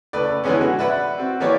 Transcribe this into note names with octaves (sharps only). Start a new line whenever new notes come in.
C#2 A3 B4 D5
D3 E3 G#3 B3 C#4
F#4
B4 D5 E5 F#5 B5
C4 F#4
E3 A#3 G4 C#5 D5